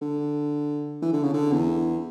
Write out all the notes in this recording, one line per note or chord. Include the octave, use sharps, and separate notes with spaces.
D3
E3
D3
C#3
D3
E2